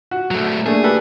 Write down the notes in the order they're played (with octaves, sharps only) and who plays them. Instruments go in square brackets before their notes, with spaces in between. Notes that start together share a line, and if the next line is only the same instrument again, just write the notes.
[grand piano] F#4
[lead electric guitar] F#3 A3
[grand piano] A3 [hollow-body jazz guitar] A#3 D4 [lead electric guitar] G#4
[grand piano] G4 A4 B4